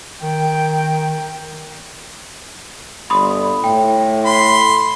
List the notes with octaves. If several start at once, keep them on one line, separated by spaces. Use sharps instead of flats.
D#3 G5
G1 B5 C6 D#6
A2 G5
B5 C6